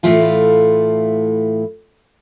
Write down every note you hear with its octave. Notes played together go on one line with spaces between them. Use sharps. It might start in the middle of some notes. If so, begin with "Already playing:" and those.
A2 E3 A3 E4 F4 F5